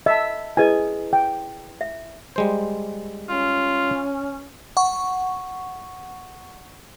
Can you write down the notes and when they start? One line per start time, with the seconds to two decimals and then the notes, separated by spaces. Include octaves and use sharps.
0.06 D#5 E5 A5
0.57 E4 G#4 B4 D#5 G#5
1.13 G5
1.81 E5
2.36 G3 G#3 C5
3.29 C#4 F4
4.77 F#5 C#6